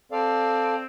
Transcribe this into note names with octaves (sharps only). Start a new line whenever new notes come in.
C4 A4 D5 F5